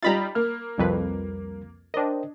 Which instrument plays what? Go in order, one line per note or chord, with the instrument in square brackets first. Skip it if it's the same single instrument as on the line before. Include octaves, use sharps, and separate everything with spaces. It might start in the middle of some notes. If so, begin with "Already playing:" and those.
[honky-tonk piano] G3 D#4 F4 [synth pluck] A#5 B5 A6
[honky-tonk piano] A#3 [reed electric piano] F6
[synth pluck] C2 F2 B4 [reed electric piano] G3 A#4
[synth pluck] D4 D#5 [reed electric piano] A#4 C5 G5